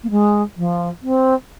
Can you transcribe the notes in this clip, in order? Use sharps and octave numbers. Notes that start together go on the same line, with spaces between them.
A#3
G#3
F3
C4